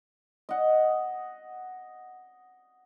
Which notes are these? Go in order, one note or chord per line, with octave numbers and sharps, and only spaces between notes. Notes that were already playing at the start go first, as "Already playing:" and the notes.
D#5 F#5